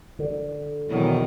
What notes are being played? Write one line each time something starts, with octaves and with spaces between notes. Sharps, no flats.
D3
E2 B2 D#3 F#3